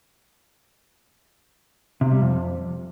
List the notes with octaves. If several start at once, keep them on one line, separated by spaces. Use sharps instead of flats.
C3
G3
F2